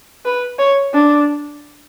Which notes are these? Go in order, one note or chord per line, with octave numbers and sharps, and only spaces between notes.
B4
C#5
D4